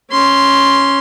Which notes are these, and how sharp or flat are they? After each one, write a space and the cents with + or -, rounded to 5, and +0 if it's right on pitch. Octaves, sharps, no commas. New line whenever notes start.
C#4 +0 C6 +0